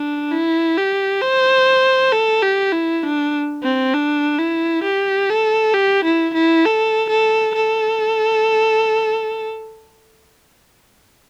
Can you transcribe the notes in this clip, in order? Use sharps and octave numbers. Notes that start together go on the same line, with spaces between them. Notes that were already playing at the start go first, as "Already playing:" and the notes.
Already playing: D4
E4
G4
C5
A4
G4
E4
D4
C4
D4
E4
G4
A4
G4
E4
E4
A4
A4
A4